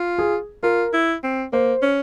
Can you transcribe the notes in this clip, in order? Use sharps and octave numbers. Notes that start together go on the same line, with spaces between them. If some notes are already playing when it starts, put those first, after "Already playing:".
Already playing: F4
G#4
F4 A#4
E4
C4
A#3 C5
C#4